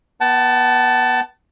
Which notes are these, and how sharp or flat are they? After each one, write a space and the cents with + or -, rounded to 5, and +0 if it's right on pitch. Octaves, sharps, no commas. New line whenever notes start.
B3 -25 F#5 +40 A5 +0